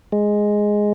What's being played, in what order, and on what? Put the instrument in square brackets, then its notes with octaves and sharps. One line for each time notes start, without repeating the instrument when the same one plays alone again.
[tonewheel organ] G#3